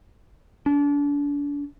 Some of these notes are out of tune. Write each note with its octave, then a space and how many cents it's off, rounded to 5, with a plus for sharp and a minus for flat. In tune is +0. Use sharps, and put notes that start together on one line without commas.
D4 -35